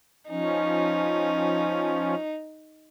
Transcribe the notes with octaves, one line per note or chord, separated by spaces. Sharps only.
F3 C#4 D#4